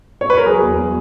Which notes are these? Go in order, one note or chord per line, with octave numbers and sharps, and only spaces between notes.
C#5
B4
A#4
F#3 G#4
E2
F#3